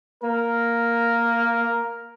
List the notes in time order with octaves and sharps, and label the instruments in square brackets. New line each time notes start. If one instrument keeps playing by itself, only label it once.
[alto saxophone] A#3 [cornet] A#4